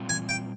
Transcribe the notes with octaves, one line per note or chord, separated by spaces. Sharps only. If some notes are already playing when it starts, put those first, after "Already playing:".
Already playing: A#2 G3 C4 F4
G#5
G5